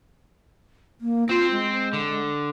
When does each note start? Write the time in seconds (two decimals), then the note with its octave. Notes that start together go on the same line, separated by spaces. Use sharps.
1.01 A#3
1.29 C4 F4 C5
1.51 G#3
1.93 D3